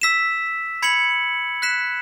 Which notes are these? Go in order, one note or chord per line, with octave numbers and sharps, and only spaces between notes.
E6 B6 E7
B5 G#6 C#7 F#7
F#6 B6 E7